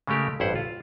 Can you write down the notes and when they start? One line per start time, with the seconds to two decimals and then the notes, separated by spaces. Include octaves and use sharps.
0.07 C#3 G#3 A3 G4 A#4
0.40 A1 G2 E4 C5 F#5
0.56 F4